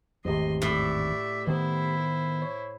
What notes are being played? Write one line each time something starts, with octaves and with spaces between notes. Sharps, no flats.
G#1 E2 A3 G4 D#5 C6
A2 D5 E5
D#3 B3 E4 C5
C#5